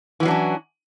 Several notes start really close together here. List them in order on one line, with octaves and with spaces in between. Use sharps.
E3 B3 F#3 D4 C#4